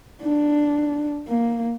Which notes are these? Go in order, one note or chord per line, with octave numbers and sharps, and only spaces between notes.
D4
A#3